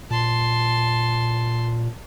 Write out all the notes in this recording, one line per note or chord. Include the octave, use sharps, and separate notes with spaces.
A#2 A5 C6